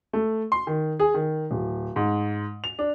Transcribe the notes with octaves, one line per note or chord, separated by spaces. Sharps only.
A3
C6
D#3
G#4
D#3
D1
G#2
F7
D4